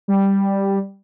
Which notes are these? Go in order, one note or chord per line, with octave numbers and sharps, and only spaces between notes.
G3